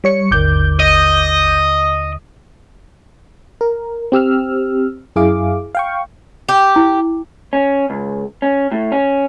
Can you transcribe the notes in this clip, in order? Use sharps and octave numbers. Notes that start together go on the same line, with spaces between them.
G3 C#5 C#7
G#1 D#2 D3 A#4 D6 G6
D#5
A#4
C4 G4 E6 F6
F#2 E4 G#4 F5 D6
F5 G5 C#6
G4
E4
C#4
C#2
C#4
A2
C#4